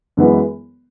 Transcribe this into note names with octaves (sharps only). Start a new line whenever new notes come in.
F#2 E3 G#3 B3